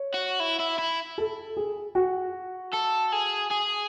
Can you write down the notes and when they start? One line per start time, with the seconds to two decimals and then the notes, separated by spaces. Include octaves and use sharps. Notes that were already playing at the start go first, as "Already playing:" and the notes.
Already playing: C#5
0.14 F#4
0.40 E4
0.59 E4
0.78 E4
1.18 A4
1.57 G#4
1.95 F#4
2.73 A4
3.12 G#4
3.51 G#4